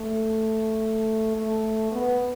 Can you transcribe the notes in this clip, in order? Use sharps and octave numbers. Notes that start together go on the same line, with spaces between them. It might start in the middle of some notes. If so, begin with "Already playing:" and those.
Already playing: A3
A3
B3